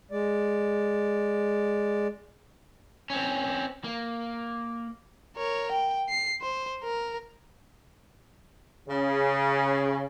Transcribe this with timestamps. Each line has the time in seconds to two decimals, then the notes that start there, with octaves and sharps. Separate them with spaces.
0.11 G#3 D5
3.10 C4 C#4
3.84 A#3
5.37 A#4 C#5
5.72 G5
6.09 C7
6.41 C5
6.84 A#4
8.89 C#3